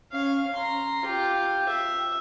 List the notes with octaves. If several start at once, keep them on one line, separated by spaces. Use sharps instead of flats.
C#4 F5
A#5 C6
F4 G4
E5